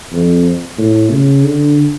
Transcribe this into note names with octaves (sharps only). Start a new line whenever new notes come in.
F2
A2
C#3
D3